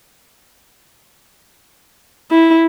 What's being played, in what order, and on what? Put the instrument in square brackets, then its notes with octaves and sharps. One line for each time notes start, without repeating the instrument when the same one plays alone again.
[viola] E4